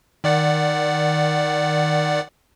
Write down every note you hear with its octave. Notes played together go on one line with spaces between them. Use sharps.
D#3 D5 F#5